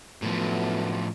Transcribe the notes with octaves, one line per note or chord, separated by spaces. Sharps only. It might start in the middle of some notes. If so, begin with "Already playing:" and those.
A2 F3 F#3 A3 B3